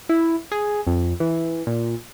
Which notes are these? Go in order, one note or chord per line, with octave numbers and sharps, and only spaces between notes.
E4
G#4
F2
E3
A#2